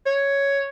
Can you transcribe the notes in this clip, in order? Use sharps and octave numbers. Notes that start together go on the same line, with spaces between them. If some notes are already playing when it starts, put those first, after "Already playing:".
C#5